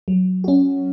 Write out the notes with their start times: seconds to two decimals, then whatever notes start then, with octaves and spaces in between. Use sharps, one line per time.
0.08 F#3
0.44 C#4 F#4